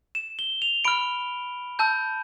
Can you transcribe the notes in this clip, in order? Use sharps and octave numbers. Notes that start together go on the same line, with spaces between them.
E7
G7
F7
B5 F6 D7
A5 E6 G6